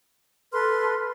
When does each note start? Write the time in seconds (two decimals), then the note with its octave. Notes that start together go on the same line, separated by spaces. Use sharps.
0.53 A4 B4 C6 F6